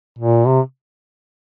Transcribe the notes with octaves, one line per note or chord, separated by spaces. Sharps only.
A#2
C3